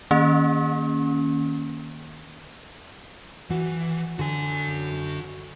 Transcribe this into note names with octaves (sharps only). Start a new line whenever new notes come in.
D#3 A#3 C#4
E3 F#4
D3 F#4 G#5